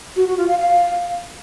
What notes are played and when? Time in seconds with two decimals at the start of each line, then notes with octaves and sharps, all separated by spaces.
0.16 F#4
0.27 F#4
0.38 F4
0.48 F5
0.59 F5